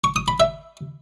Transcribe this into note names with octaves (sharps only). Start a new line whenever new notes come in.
C#6
D#6
B5
E5